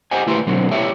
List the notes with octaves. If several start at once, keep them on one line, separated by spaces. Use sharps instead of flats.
G4 C5 D#5 F#5 G#5
D2 A3 E4 G4 B4 C6
B2 D3 F#3 C4
E4 G4 A4 C#5 E5